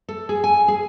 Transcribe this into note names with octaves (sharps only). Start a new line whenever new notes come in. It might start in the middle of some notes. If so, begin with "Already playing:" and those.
A4
G#4
G#5
G#4